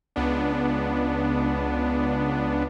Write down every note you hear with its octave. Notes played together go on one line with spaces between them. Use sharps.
C#2 B3 D4